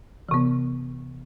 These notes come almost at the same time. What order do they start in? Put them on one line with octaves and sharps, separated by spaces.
E3 C3 B3